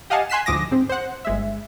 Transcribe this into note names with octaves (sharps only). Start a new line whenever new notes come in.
G4 D#5 F5 F#5 G#5 A5
G#5 C6 F#6 B6 C7 E7
D2 G#2 F3 D6 D#6 A#6
G#2 C4
C5 F#5
G1 G#3 E5